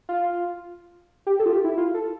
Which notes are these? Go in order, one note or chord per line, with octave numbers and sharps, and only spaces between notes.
F4
G4
A4
F4
G4
E4
F4
A4